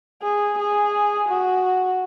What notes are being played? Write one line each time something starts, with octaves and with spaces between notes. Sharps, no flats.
G#4
G#4
F#4